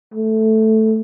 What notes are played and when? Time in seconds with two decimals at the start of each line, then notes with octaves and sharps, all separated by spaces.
0.14 A3